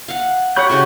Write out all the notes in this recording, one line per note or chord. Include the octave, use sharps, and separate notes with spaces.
F5 F#5
G4 C#5 F#5 B5 G6
C#3 A3 F#4